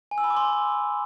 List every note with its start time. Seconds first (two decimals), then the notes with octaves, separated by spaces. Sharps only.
0.11 G#5
0.18 E6
0.24 B5
0.30 D6
0.37 C6